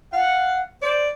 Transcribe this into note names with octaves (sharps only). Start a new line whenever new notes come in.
F5 F#5
C5 D5